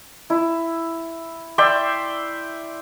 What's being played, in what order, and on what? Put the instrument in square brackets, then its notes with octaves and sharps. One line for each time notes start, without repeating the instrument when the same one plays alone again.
[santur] E4
D5 E5 G5 C6